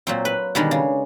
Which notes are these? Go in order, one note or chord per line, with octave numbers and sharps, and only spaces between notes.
A#2 F#3 C4
B4
B2 D3 D#3 G3 G#3
C#3